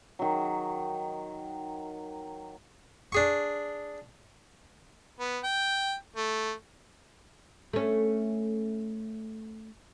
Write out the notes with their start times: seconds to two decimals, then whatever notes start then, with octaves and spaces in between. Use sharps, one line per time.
0.19 D#3 F#3
3.12 D4 G#4 C#6
5.20 B3
5.44 G5
6.16 A3
7.73 A3 C#4